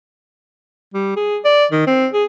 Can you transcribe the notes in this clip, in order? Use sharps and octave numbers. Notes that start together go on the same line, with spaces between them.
G3
G#4
D5
D#3
C4
G#4